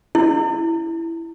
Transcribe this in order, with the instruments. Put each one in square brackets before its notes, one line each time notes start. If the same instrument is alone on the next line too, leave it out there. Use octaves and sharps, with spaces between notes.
[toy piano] E4